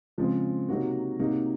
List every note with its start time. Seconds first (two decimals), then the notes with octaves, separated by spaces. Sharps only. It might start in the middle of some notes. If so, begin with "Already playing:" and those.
0.18 C#3 F3 G#3 C4
0.69 C3 F#3 A#3 D#4 F#4
1.19 C3 F#3 A#3 D#4